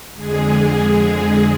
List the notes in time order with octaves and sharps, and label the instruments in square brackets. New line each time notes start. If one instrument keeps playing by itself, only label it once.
[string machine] F2 D3 G#3 G#4